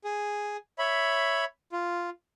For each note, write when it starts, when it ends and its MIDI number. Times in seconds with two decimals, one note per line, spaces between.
0.04 0.57 68
0.79 1.45 73
0.79 1.45 76
0.79 1.45 83
1.72 2.10 65